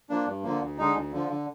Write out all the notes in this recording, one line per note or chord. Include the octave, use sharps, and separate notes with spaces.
F3 A#3 D4
G2
D3 F3 A#3
D2
D3 G#3 D#4
D2
D3 F3
D3